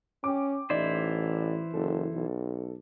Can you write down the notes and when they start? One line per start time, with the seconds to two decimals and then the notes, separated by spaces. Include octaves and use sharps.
0.24 C#4 G5 D6
0.70 A1 E3 D#4 E4 C5 D5
1.74 F#1 A4
2.14 B1